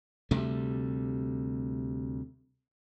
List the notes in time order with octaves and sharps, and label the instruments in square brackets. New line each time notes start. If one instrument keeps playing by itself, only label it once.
[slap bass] D2 C3 G3 A3